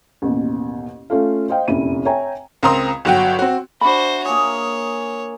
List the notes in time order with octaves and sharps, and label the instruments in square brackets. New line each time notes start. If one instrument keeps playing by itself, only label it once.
[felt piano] A1 D#2 B2
A3 C#4 F4 A4 F5
C5 D#5 F5 G5
F1 A#1 F#2 E4 D#7
C#5 E5 G5 G#5 A#5
[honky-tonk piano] C#2 C4 A#4 A#5 C6 D#6
G1 F#3 F#4 F#5 G5
C4 F#4
[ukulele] D4 E5 B5 [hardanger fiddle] F#4 C5
[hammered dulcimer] A#3 G#4 [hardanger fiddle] C#5